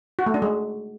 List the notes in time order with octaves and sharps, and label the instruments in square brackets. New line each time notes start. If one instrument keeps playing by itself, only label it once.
[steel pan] F#4
A3
D4
G#3